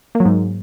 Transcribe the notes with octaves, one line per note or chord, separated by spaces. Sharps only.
A#3
F#3
G#2